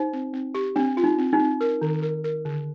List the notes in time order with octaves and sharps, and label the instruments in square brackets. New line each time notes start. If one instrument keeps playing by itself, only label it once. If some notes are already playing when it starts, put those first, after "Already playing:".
Already playing: [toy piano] D#4 [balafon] C5
[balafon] C4
C4
G4
[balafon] C4 [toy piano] D4
[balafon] F4
[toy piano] D#4
[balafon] C4
[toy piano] D#4
[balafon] C4
A#4
D#3
A#4
A#4
D3